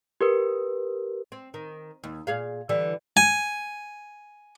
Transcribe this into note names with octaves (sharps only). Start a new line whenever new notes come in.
G4 A#4 B4
C4
D#3
D#2
A#2 G#4 F5
D3 E3 G3
G#5